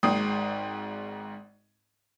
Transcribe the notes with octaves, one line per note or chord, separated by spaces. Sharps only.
G#1 G#2 G5 D#6 C7